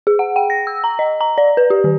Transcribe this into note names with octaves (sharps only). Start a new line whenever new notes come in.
G#4
F#5
G5
A#6
E6
A#5
D#5
A#5
D5
B4
G4
D#3